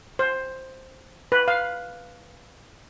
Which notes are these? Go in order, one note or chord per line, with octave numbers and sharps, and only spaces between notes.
C5
B4
F5